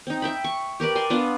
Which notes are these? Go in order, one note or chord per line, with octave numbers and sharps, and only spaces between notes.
C4 D#4
E5 G5 B5
C#6
G4 A#4 B4 D5
D5 G#5 C6
B3 D4 F4 F#5